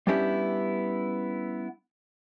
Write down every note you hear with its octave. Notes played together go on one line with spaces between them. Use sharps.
G3 B3 C#4 D4 E4 G4